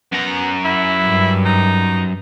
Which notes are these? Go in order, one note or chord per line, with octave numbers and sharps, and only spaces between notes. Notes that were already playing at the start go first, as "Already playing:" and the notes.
F#2 B3 A#5
E4
G2
D#4